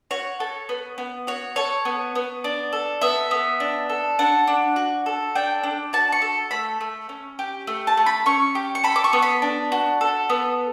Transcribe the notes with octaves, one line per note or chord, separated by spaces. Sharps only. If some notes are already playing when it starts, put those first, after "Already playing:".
F#4 C#5
A4
B3
B3
F#4 C#5
A4 C#5
B3
B3
D4
A4
B3 E5
B3
D4
A4
D4 F#5
D4
F#4
A4
D4 G5
D4
F#4 A5
C#6
A4
A3 B5
A3
C#4
G4
A3
A5
A3
B5
C#4 C#6
G4
C#6
A4 B5
D6
C#6
B3
B5
D4
F#4
A4
B3